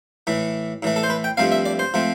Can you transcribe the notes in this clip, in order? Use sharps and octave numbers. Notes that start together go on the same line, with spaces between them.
A2 E3 A3
A2 E3 A3
A4
C5
B4
G5
G2 F3 A3 C4 F5
E5
D5
C5
F3 A3 C4